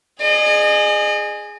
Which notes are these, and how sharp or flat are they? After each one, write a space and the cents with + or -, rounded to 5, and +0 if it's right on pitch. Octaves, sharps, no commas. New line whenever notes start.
G#4 +0 D#5 -40